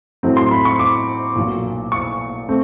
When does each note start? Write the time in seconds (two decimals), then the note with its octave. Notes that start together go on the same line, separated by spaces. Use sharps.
0.23 A2 F#3 A3 C4
0.37 C6
0.51 B5
0.65 C#6
0.79 D6
1.36 B1 A#2 F#3
1.92 C#6
2.49 A3 C4